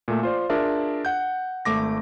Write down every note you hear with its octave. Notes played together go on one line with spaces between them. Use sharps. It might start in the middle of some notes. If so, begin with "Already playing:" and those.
A#2 A3
F4 C5 D5
D4 F4 G#4 A#4 D5 E5
F#5 G6
G#1 A3 D6 A#6